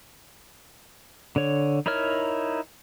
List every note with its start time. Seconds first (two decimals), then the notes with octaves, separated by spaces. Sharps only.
1.36 D3 C#5
1.86 D#4 E4 A#4 C#5 F6